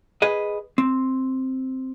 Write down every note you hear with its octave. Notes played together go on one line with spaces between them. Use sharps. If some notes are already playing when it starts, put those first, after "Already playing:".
G#4 B4 D#5
C4